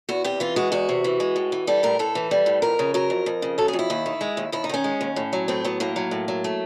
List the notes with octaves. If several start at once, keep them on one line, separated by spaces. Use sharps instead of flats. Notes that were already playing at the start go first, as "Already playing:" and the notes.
E2 F#4
C3 G4
E3 F4
G#3 F#4
E2 F#4
C3
E3
G#3
A2
E3
G3 A4
A2 A#4
A2 A4
E3
G3
A2
F2 A#4
C#3
F#3 A#4
F2
F2
C#3
F#3 A4
G#4
F2
E4
D#2
D#3
G#3
D#2
D#2 E4
D#4
D#3 C#4
G#3
D#2
A2
F#3
A2 C4
F#3 B3
A2 A#3
F#3
A2
F#3
A3